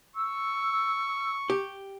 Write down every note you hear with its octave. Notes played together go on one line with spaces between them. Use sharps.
C#6 E6
G4